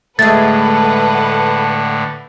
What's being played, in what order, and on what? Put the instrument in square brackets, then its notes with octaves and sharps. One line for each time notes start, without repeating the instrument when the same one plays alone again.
[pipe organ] A2 D3 [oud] G#3 A3 [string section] A4 B4 F#5 [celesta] A6